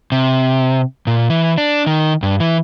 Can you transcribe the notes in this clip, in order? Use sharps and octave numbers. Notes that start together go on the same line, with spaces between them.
C3
A#2
E3
D4
D#3
G2
E3